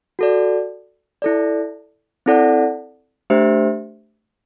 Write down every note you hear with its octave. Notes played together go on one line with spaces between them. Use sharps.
F#4 A4 D5
E4 A4 D5
C4 E4 A4 D5 F#5
A3 D4 G4 C5 E5